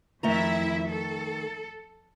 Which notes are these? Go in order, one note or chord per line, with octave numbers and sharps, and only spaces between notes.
F2 D#3 A3 E4 E5 A#5
A4